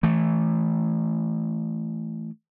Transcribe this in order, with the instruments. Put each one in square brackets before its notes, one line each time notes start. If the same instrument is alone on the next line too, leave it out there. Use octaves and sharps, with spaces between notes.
[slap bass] E3 A3